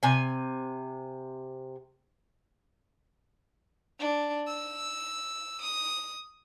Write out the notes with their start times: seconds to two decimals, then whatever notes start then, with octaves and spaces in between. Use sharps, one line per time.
0.03 C3 G#5
3.99 D4
4.47 E6
5.61 D#6